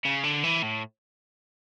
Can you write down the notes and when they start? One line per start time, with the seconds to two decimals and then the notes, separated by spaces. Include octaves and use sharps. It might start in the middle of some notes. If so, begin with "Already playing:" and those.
0.05 C#3
0.24 D3
0.43 E3
0.62 A2